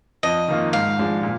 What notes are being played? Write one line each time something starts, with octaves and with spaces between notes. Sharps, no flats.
F2 D#5
D#3 A#3 F4
G#2 F5
F3 G#3 D4
A#2